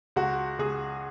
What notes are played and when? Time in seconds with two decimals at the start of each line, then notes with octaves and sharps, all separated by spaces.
0.16 C#2 F#4
0.59 C#2 G#4